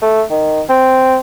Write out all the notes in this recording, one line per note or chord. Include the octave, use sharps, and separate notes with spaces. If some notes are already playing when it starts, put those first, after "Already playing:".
A3
D#3
C4